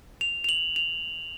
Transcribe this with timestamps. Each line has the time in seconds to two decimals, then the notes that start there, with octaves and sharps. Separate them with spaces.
0.21 F7
0.44 F7
0.49 F#7
0.76 F7